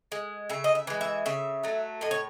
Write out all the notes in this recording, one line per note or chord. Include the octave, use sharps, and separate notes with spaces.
G#3
C#3 E5
D#5
E5
E3 G#3
E5
C#3 E5
F#3 A3
A2 D#5
C#5